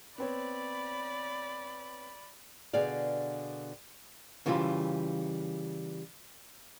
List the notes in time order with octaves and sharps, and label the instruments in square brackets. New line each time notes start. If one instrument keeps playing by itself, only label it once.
[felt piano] B3 C4 C#5 [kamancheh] D5 B5
[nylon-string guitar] B2 D3 G#4 D5 F5
[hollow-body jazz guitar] C#3 E3 G3 F4